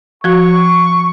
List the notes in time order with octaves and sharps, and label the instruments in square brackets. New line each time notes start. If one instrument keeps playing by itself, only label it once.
[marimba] F3 F#4 [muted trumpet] C#6